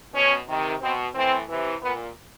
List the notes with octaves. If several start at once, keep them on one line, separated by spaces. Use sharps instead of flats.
B2 C#4
C3 D#3
B2 C4
A2 E3 C4
C3 E3
A#2 B3